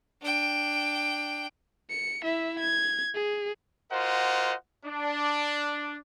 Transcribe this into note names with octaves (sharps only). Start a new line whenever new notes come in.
D4 G5
C#7
E4 E5
G#6
G#4
F4 F#4 A#4 C5 D#5 F#5
D4